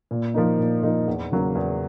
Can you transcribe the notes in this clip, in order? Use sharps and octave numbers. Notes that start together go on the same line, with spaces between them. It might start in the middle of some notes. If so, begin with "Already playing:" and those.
A#2
F3 A#3 D#4
A#2
F3 A#3 D#4
E2
C#3 F#3 A#3
E2